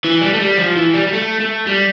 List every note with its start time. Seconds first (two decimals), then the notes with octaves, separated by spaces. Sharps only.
0.04 E3
0.21 G3
0.34 A3
0.40 G3
0.58 F3
0.76 E3
0.94 G3
1.07 G3
1.13 A3
1.40 A3
1.67 G3